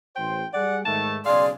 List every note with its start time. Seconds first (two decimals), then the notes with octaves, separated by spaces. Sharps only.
0.16 A1 C5 G5
0.53 G3 G#4 D5 F#5
0.85 G#2 D#3 A3 A5
1.26 B1 C#3 G#4 D5 F5 C6